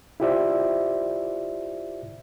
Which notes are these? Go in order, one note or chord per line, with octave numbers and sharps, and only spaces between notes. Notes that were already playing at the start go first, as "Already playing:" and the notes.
E4 F4 G4 C5 D5 E5